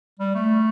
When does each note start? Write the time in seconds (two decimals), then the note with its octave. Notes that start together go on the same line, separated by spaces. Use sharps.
0.19 G3
0.35 A3